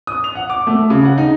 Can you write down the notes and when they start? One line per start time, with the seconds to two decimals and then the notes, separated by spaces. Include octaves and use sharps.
0.07 D#6
0.24 F7
0.35 F#5
0.50 D6
0.67 A3
0.90 C#3
1.05 F#5
1.18 D#4